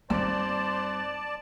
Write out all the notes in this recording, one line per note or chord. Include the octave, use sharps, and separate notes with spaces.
G2 A#3 C4 D#4 C5 D5 A5